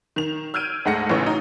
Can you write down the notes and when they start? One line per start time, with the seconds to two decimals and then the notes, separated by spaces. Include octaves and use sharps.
0.16 D#3 F7
0.54 E6 F6 G6 G#6 D7 D#7
0.85 D2 G#2 G#3 F#5 A#6 C#7
1.09 A1 C#3 E3 C#6
1.23 F#3 D#4